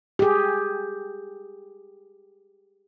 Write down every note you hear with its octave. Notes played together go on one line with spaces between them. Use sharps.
G4 G#4